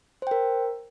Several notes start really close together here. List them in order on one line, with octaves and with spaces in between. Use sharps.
C5 G5 A#4